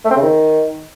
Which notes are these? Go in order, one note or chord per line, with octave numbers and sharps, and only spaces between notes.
A3
C4
C#3
D#3